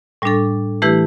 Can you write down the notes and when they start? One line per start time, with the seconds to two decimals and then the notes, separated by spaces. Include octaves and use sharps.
0.22 A2 G3 D4 A4
0.82 E3 A3 E4 G4 B4